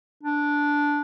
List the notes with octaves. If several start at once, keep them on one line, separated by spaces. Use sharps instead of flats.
D4